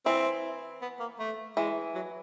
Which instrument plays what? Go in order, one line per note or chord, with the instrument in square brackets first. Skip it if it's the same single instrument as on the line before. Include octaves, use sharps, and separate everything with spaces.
[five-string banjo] E3 [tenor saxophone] C4
[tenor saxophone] B3
A#3
A3
[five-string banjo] E3 [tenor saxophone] G#3
[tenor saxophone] F#3